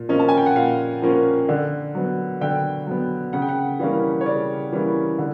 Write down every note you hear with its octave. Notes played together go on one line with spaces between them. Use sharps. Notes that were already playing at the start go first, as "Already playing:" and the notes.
Already playing: A#2
F3 A#3 C#4 D#5
A5
G#5
G5
F#5
A#2 F5
F3 A#3 C#4
D3
F#3 B3
D3 G5
F#3 B3
C#3 F#5
G5
F#5
E3 G3 A#3 C#4 F5
C#5
C#3 D5
E3 G3 A#3 C#4
D3